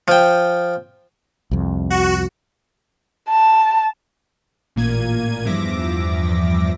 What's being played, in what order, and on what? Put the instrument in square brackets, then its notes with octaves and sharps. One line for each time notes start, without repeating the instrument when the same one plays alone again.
[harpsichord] F3 G5
[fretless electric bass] C2 F2
[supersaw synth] F#4
[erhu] A5
[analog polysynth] A1 A#2 A#3 G#6 D#7
E2 G2 F3 E5 D6 A#6